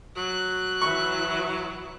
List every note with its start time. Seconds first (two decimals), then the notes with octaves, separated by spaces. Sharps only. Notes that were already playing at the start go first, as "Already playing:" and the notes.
0.17 F#3 F#6
0.82 E3 B4 E5 C#6